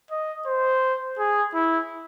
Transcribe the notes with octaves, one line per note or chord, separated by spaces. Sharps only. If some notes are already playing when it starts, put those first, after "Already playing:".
D#5
C5
G#4
E4